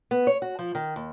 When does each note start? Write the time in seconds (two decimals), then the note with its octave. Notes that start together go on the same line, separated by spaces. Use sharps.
0.11 B3
0.27 C#5
0.42 F#4
0.59 F3
0.75 D#3
0.96 D#2